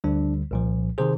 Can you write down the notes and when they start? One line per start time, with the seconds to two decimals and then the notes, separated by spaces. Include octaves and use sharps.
0.04 D2 D3 G3 D4
0.51 C2 A#2 F3
0.98 C3 D#3 G#4 C5